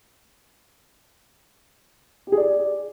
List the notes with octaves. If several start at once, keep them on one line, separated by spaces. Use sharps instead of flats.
G4
G#4
D5